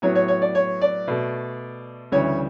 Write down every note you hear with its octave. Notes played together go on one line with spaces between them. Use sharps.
A2 F#3 B3 C#5
C#5
C#5
D5
C#5
D5
B2 A3
D2 C#3 E3 G3 C#5